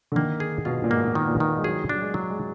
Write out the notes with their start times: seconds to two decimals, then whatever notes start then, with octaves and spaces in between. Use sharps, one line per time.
0.12 D3
0.16 D#3 A#3
0.40 G#4
0.65 B2 F4
0.84 A#2
0.90 G#2 A#3
1.15 D#3
1.28 A#2
1.40 D#3
1.58 G#3
1.64 F#3 G#4
1.89 F#3 D4
2.02 G#3
2.14 F#3
2.30 G#3